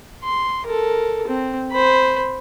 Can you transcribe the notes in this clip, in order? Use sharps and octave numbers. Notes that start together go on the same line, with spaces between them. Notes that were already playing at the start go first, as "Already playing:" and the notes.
C6
A4 A#4
C4
C5 B5